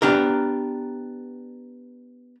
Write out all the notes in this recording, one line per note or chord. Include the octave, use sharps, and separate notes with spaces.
B3 D4 G4 A#4